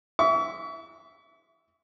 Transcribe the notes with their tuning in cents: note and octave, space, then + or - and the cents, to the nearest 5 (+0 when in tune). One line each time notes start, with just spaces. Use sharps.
E5 +0 C#6 +40